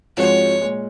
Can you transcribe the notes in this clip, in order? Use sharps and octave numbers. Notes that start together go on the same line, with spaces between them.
G#2 F3 G#3 C4 F#4 C#5
A#2 G#3